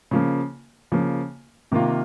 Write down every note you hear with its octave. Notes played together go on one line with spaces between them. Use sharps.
C#3 F3 A#3
C#3 F3 A#3
C3 D#3 A#3 F4